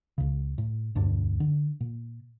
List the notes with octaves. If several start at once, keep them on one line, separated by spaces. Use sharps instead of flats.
C#2 C#3
A2
E1 D2 G2 D4
D3
A#2